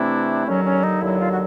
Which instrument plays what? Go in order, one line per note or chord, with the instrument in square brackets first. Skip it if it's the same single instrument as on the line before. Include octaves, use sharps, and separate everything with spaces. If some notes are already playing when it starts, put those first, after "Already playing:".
Already playing: [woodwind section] C3 E3 A3 C4 E4 [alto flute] D4
[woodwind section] D#2 D3 F#3 [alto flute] C#4
[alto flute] C#4
D#4
[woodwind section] D#2 D3 F#3 [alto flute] E4
[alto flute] F4
F#4